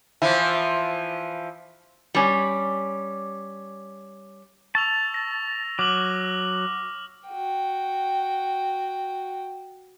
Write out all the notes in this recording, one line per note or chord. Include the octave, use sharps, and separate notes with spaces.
E3 F3 E4
G3 C#4
A5 C#6 E6 F7
A#6
F#3 D6 F6 F#7
F#4 G5